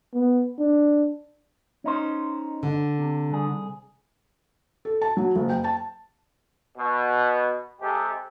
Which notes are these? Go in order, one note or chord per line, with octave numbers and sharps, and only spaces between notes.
B3
D4
C#4 D#4 C5
D3
C3
C2 G#4
A4
A5
F#3
F#1
G5
A5
B2
C3 G#3 G4 A4